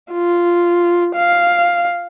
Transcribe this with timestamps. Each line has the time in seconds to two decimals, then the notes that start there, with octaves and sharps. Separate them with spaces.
0.11 F4
1.15 F5